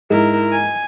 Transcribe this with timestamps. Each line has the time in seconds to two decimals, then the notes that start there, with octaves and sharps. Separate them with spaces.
0.10 G#2 E4 A#4
0.52 G#5